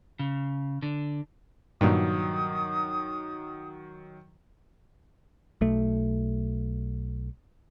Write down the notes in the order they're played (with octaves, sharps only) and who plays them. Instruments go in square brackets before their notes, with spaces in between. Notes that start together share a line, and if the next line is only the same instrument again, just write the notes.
[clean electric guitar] C#3
D3
[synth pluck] G2 A#2 [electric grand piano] D#3 F#3 [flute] D#6
[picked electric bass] B1 A3